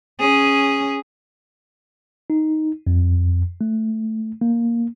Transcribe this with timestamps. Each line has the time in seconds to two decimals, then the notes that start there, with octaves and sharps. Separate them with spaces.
0.19 C#4 G#4
2.30 D#4
2.87 F2
3.61 A3
4.41 A#3